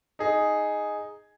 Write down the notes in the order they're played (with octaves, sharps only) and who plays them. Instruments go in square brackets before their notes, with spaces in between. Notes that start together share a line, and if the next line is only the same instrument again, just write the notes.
[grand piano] D#4 G#4